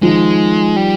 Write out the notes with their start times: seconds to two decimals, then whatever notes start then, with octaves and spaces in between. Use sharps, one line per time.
0.02 D#3 F3 G#3
0.76 G3